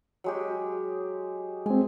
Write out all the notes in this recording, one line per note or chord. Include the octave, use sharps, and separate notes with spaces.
F#3 G#3 G4
G#3 C4 G#5